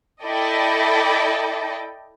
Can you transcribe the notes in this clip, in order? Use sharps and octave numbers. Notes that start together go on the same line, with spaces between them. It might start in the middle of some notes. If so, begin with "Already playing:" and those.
E4 A4 D5 D#5 G5